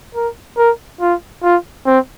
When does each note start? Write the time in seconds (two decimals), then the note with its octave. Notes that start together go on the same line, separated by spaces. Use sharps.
0.15 A#4
0.57 A#4
1.01 F4
1.43 F4
1.86 C4